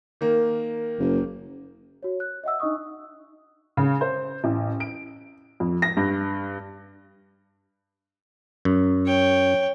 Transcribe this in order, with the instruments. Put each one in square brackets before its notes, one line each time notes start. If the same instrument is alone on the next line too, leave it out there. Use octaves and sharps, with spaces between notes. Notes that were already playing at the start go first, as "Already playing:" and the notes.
[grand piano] D#3 A#3
[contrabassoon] F#1
[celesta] F#4 C#5
F#6
D#5 E5 F#5 E6
D4 D#4 D#5 C#6 D#6
[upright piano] C#3
C5
A1
D7
F2
A#6
G2
[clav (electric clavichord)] F#2
[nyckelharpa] C#5 G5